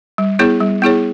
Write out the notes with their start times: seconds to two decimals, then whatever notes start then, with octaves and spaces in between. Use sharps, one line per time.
0.18 G3
0.39 B3 E4 G#4 C#5
0.60 G3
0.82 B3 E4 G#4 C#5